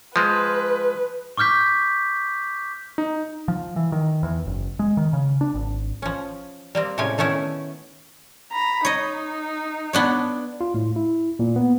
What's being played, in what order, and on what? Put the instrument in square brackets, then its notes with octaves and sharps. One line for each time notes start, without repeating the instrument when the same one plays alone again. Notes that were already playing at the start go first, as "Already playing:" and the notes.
[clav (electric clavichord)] F3 G#3 [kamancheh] B4
[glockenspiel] C#6 D6 F6 G6 B6
[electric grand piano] D#4
[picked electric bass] F3
E3
D#3
E2
F#1
G#3
D#3
C#3
D4
G#1
[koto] F3 C#4
G3 A#3 C4
A2 C3 G#3 C#4 G4 G#5
D#3 A3 B3 C#4 E4
[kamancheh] A#5 B5
[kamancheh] D#4 [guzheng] C#5 D#5
[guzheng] B3 D4 C#5
[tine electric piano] F4
A2
E4
A#2
B3